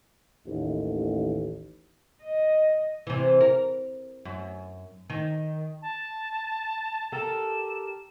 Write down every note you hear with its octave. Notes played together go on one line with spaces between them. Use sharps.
A1 D#2
D#5
C3 E3
A#4
F#2
D#3
A5
G4 A4 A#4 E7